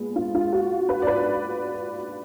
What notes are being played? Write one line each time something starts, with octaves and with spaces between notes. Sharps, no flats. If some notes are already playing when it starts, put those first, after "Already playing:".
Already playing: A#2 G#3 B3
F4
F4
F#4
B4
D5
B4